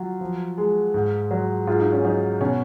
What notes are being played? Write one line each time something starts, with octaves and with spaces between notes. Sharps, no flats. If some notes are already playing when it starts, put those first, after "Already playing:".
Already playing: F#3 F4
F3
G#3
G#2
F#3
G#2 F4
D#4
C#4
F#3 D#4
B2 C#4